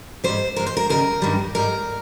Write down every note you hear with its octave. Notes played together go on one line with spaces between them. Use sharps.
G#2 G3 C5
A#2 G#3 A#4
C5
A#4
D#2 C#3 G3 A#4
G2 D#3 G3
G#2 G3 A#4